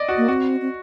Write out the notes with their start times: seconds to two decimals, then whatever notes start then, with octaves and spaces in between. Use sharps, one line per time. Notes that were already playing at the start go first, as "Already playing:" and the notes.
Already playing: D5 D#5
0.09 F#4
0.17 A#3
0.28 C4 F#4
0.62 C4